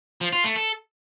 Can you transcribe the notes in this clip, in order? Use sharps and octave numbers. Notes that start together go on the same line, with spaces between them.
F3
F4
A3
A4